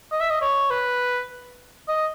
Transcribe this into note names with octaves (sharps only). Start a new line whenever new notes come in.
D#5
E5
D#5
C#5
B4
D#5